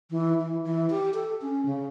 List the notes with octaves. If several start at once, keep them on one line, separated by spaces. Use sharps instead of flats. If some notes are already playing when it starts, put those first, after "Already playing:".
E3
E3
E3
G4
A4
C#4
C#3